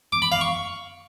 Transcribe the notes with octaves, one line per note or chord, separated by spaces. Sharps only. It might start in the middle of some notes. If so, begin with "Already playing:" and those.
D6
B5
F5
C#6